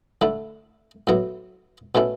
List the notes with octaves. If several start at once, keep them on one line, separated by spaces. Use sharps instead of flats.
D3 A3 E4
A2 F#3 B3 E4
B2 A3 C#4 E4